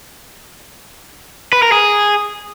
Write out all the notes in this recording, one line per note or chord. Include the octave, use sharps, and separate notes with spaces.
B4
A#4
G#4